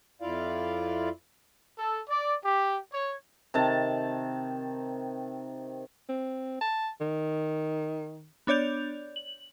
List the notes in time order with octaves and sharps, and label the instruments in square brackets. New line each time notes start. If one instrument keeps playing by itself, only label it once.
[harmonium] F2 E4 F4 D5 F5
[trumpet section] A4
D5
G4
C#5
[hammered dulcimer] C3 D#3 A5
[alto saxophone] C4
A5
D#3
[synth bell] B3 D4 C#5 D5 G6 F7
F#7